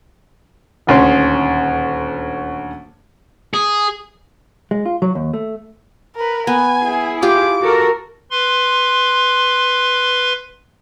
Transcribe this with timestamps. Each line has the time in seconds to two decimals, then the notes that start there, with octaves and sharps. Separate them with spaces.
0.87 D#1 D2 C#4 C6
3.54 G#4
4.71 G#3
4.86 F4
5.02 F#3
5.15 D#2
5.34 A3
6.16 A#4 B4
6.47 B3 G#5
6.82 E4 G#4
7.22 F4 G4 D6
7.61 F#4 A4 A#4
8.31 B4 C6